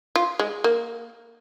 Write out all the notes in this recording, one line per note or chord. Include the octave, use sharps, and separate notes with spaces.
F4
G#3
A#3